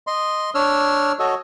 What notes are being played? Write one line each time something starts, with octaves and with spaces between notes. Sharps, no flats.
D#5 C6
D4 C#5 E6 F6
F#4 A4 C#5 D#5